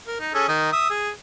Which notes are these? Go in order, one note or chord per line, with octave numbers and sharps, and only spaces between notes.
A#4
D#4
C#4 G#4 A4
D#3 D#5
E5 D#6 E6
G#4